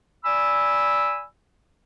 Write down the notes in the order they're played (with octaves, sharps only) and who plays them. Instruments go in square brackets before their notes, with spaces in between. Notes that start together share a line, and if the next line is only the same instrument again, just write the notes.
[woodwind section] D5 G#5 B5 E6